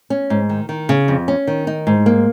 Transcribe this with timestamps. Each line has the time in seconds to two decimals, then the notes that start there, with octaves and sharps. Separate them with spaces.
0.10 C#4
0.30 G#2
0.49 D#3
0.69 D#3
0.89 C#3
1.08 F2
1.28 C#4
1.47 D#3
1.67 D#4
1.87 G#2
2.06 A#3